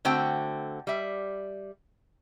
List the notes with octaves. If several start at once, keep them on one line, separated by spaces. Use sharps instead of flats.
D3 A3 C4 F#4 G5
G3 E5